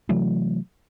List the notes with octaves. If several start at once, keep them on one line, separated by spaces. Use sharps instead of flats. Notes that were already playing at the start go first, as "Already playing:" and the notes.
C3 E3 F#3 A3